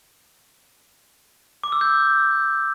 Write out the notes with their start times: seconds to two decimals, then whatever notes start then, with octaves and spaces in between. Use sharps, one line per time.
1.64 D6
1.72 E6
1.81 G6